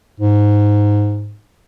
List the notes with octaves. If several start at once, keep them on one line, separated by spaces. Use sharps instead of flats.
G#2